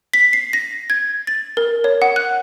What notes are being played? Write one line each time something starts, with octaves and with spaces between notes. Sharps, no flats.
B6
C7
A#6
G#6
A6
A#4
C#5
F#5
F#6